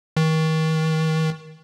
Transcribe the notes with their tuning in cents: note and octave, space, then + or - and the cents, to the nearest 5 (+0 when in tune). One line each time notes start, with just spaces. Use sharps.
D#3 +35